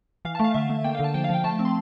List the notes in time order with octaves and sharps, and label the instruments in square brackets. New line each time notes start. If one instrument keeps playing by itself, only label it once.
[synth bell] E3 F5
A5
A3 F5
D3 E5
A3
A#3 G5
F5
D3 A5
F3 G5
F5
F3 G5
A3 A5
C4
C6